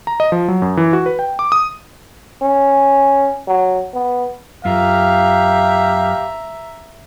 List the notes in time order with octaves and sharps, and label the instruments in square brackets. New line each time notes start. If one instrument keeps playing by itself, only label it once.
[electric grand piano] A#5
D#5
F3
F#3
F#2
E3
F#4
B4
G5
D6
D#6
[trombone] C#4
F#3
B3
[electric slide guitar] F#2 F4 [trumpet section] G4 F5 [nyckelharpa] E5 A#5